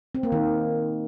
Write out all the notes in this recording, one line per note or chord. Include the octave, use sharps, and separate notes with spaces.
C4
A#3
D#3